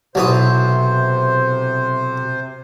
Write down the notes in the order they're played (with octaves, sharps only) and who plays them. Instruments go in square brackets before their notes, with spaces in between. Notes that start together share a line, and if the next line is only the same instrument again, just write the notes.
[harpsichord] B1 E3 D#6 [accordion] C3 C5